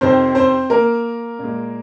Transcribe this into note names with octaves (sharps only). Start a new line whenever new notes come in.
F2 C3 D#3 C4 C5
C4 C5
A#3 A#4
A#2 G#3